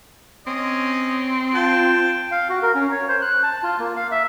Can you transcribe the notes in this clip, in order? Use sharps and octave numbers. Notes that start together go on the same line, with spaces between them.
C4 C#4 D#5
F4 G5 A5
F5
F#4
A#4
C#4
C#5
C5
F#6
A5
F4
A#3
F5
E5